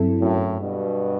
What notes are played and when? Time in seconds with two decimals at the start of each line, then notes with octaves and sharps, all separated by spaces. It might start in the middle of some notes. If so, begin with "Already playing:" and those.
Already playing: G2 F#3 C4 E4 A4
0.21 F#2 A2
0.61 G2 B2